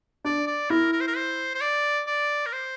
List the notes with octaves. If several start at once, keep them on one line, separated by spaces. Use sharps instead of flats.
D4 D5
D5
E4 A#4
A#4
C5
A#4
C5
C5
D5
D5
A#4
C5